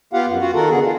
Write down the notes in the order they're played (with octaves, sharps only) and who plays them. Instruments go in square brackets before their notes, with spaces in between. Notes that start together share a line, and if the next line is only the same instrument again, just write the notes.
[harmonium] B3 F4 G4 F5 F#5
F#2
F4 F#4 F#5
D#3 A4 A#4 F#5
D3 B3 G#4
F4